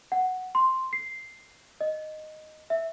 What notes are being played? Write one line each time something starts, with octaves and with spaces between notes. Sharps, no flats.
F#5
C6
C7
D#5
E5